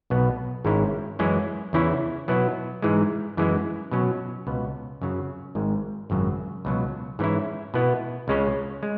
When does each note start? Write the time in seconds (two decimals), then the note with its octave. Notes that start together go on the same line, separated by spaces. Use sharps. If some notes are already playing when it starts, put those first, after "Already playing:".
0.10 B1 B2 B3
0.65 G#1 G#2 G#3 C#4 E4
1.19 F#2 E3 G#3 C#4 E4
1.73 E2 C#3 E3 C#4 E4
2.28 B2 F#3 B3 E4
2.82 G#2 E3 G#3
3.37 F#2 E3 G#3 E4
3.91 B2 F#3 C#4
4.47 C#2 B2 B3
5.02 F#2 C#3 F#3
5.55 G#1 G#2 G#3
6.10 G#1 F#2 C#3 F#3
6.65 C#2 B2 F#3
7.19 G#2 E3 C#4 E4
7.74 B2 B3 E4
8.28 C#2 C#3 G#3 C#4
8.83 G#3